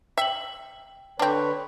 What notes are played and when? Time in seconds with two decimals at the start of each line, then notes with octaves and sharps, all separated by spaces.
0.18 E5 G5 F#7
1.19 D3 C4 D4 B4 C#5